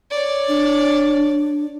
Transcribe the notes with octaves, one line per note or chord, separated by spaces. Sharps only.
C#5 D5
D4